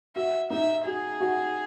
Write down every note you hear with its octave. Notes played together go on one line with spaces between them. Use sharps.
F#4 E5
D#4 E5
F#4 G#4
F#4